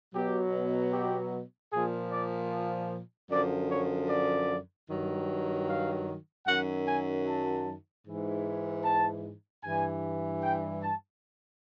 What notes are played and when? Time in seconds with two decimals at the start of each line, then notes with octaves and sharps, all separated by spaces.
0.14 B2 F#3 G4
0.93 G4
1.72 A#2 F3 G#4
2.12 D5
3.30 F#2 D3 F3 D5
3.70 C#5
4.09 D5
4.89 G2 D#3 F#3
5.68 F5
6.47 F#2 D#3 F#3 F#5
6.87 G#5
7.26 A5
8.06 G#2 E3
8.84 A5
9.64 G2 E3 G#5
10.43 G5
10.83 A5